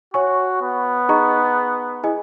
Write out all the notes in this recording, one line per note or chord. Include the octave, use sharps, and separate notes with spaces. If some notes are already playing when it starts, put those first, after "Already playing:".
F#4 C#5 G#5 C#6
B3
D#4 G#4 D#5 A#5 C#6
E4 G#4 D#5 G#5